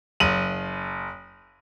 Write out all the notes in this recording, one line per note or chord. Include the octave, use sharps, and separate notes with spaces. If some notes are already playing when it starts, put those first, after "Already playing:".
F#1 D#7 F#7